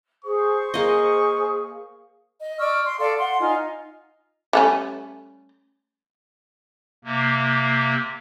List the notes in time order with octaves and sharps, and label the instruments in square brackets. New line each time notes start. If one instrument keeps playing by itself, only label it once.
[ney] G#4 [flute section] C5 [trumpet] C#6
[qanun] A#3 D#5 [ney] G#4
[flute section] D#5
D5 C#6 E6 F6
C6
A4 D5 F5
F#5 C6
D#4 F4 G#5
[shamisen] G3 A3 C#4
[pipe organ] C3 A#3